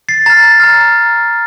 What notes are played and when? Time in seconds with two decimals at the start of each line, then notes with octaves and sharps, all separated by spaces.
0.09 A6 C7
0.26 A#5 F6 A6
0.60 A#5 F6